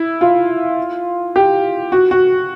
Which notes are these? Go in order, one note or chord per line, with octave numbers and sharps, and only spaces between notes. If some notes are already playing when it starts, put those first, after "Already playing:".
Already playing: E4
F4
G4
F#4
F#4